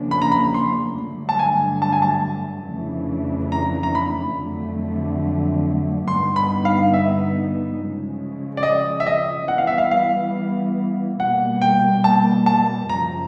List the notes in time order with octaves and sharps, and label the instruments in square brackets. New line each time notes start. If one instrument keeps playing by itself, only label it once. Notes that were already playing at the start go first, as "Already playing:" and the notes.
Already playing: [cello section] E2 C#3 F3 A#3 D4
[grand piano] B5
A#5
B5
C6
[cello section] G2 D3 F#3 A3
[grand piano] A5
G#5
A5
G#5
A5
[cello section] F2 C#3 E3 A3 D4
[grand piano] A#5
A#5
B5
[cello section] F2 D3 F#3 A3
[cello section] G2 D3 G3 B3 D#4 [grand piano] C6
[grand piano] B5
F5
E5
[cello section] C#3 F3 G#3
[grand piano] D5
D#5
E5
D#5
[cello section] E3 G3 B3 [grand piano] F#5
[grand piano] F5
E5
F5
F5
[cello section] B2 G3 A#3 [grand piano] F#5
[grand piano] G5
A5
A5
[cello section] F#2 C#3 F3 [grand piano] A#5